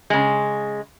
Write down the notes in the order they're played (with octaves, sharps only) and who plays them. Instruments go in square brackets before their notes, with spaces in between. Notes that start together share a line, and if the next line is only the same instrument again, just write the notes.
[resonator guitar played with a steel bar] C#3 G#3